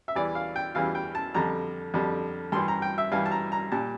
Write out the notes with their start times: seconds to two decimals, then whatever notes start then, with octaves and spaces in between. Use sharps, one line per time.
0.08 E5
0.15 E2 E3 G3 D5
0.35 F5
0.56 G5
0.75 E2 E3 G3 F5
0.95 G5
1.15 A5
1.34 F2 D3 G3 A#5
1.94 F2 D3 G3
2.52 G2 E3 G3 C6
2.68 A#5
2.82 G5
2.98 E5
3.12 G2 E3 G3 F5
3.26 A5
3.31 A#5
3.52 A#5
3.72 A#2 G3 A5